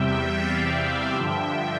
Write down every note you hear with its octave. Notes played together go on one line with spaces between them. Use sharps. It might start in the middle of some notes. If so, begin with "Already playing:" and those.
Already playing: E2 C3 G3 E5 G5
D5 F5
G2 D3 F3 E5 G5